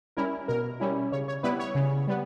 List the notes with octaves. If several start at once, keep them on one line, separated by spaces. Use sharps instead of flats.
G3 C#4 E4 A#4
B2 A#4
G3 C#4 E4
C#3 C#5
C#5
G3 B3 E4 B4
C#5
C#3
G3 B3